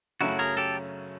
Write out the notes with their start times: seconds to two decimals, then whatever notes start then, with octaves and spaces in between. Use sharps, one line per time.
0.21 F#2 C#3 F#3 A3 C#4 E4 F#4
0.39 G#4 A#4
0.57 G4 A4